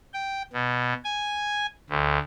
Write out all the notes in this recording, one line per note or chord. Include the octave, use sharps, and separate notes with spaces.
G5
B2
G#5
D2